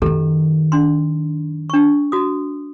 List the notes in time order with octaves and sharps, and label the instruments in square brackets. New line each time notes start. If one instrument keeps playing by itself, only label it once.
[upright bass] F#2 D#3 [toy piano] G4 A4 A#5
[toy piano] D4 C6
D4 C#6
F#4 D#6